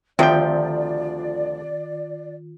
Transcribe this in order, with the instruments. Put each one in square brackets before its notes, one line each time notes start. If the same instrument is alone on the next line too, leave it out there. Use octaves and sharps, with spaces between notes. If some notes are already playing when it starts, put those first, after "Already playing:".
[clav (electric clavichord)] D2 F3 G5 [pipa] C3 [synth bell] D#3 F4 [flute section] D5